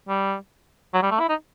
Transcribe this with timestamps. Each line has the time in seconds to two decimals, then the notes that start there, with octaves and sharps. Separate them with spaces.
0.09 G3
0.94 F#3
1.03 G3
1.11 A3
1.20 E4
1.29 D#4